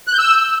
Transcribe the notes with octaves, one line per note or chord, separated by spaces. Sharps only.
F#6
G6
E6